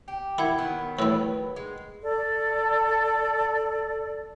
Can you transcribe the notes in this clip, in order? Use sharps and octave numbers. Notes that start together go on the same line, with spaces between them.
G4
E4 A#4 F#5 G#6
D#3 F#3 B3
A2 G3 B4 E6
G#3
A4 D5